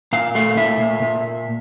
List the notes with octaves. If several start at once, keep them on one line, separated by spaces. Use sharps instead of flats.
A#2 F5
A3 F5
A#2 E5
A#2
A#2